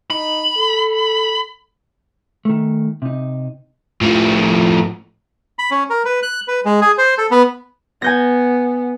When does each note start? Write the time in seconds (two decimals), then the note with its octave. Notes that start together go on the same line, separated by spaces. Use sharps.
0.10 D#4 B5
0.57 A4
2.45 D#3 A3
3.02 C3 D#4
4.01 A2 F3
5.59 B5
5.71 C#4
5.90 A#4
6.05 B4
6.23 F#6
6.48 B4
6.65 G#3
6.81 G#4
6.98 C5
7.18 A4
7.31 B3
8.02 B3 G#5 G6 A#6